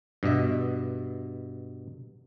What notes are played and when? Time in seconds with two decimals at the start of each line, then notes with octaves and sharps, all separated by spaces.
0.23 G2 B2 D#5 E5